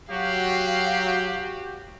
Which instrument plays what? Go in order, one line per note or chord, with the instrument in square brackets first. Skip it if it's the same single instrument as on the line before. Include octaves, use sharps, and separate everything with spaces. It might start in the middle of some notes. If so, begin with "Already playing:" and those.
[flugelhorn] F#3 [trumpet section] F#4 G4 [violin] F5